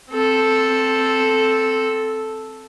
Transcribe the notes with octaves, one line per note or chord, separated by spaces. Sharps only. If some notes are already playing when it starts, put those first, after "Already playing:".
C4 A4